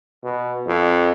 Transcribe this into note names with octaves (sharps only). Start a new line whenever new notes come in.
B2
F2